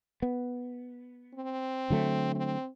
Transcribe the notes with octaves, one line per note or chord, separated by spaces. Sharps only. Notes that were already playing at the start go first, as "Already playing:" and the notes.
B3
C4
D3 F#3 A3
C4